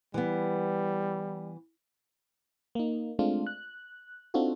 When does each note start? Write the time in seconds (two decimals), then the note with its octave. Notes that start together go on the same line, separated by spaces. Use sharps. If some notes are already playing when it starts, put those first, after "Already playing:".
0.14 E3 G3 B3
2.75 A#3 D#4
3.19 G#3 A3 C4 D4 F4
3.47 F#6
4.34 C4 D4 D#4 F4 F#4 A4